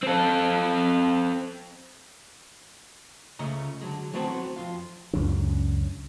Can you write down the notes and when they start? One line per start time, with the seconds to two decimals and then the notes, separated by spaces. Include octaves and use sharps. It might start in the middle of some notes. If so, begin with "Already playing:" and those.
0.03 C4 A4
3.39 C#2 C#3 A3 C#4 D#5 A#5
3.81 D3 F#3 G#3
4.13 E3 F#3 A3 B3 C4 F#4
4.56 F2 A#2 F4 F5
5.13 C#2 F#2 F#3 D4